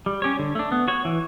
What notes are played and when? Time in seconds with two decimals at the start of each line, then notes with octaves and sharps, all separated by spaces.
0.06 G3
0.22 C#4 G4 C#5
0.39 D3
0.55 A3 D4
0.72 B3
0.88 F#4 C#5
1.05 E3